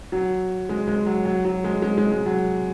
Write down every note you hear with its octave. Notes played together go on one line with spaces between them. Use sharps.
F#3
G#3
G#3
F#3
F#3
F#3
G#3
G#3
G#3
G#3
F#3